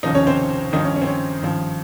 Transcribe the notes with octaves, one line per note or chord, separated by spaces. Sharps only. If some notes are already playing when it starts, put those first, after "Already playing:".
F1 D#2 C#3 F3 D#4 D#5
C#4 C#5
C4 C5
G#1 G2 D#3 F3 D#4
C#4
C#4
C4
C#4
G#1 G2 F3